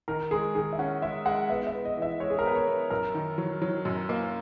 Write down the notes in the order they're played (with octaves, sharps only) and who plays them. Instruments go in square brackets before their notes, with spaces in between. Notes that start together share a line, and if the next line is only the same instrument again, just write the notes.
[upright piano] D#3 [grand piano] A#4
[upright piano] G#3 [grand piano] G#4
[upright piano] D#3 [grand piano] G#4
[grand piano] E5
[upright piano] C#4 [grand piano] F#5
[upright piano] G#3 [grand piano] E5
[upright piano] G#3 [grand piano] F#5
[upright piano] B3 [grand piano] E5
[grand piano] E5
[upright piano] B3
[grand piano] D#5
[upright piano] E3
[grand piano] E5
[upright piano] G#3 [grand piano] C#5
[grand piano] G#4
A#4
[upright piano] B3 [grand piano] B4
[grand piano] C#5
[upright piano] B3
[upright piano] F#2 [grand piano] A#4
[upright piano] D#3
F#3
F#3
F#2
A#3